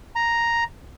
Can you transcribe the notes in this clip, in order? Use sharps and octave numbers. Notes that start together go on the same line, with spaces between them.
A#5